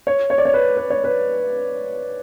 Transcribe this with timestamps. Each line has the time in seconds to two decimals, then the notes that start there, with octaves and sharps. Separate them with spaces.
0.07 C#5
0.30 C#5
0.38 D5
0.45 C#5
0.54 B4
0.77 B4
0.90 C#5
1.04 B4